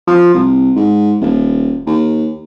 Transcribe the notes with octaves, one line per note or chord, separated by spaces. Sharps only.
F3
C2
G#2
D#1
D#2